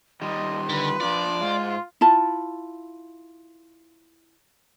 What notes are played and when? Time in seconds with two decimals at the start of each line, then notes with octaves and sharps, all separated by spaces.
0.22 D#3 G3 D#5 C6
0.69 D3 B4
1.00 F3 D4 F4 D5
1.41 G#2 G#3 F4
2.01 E4 F4 A5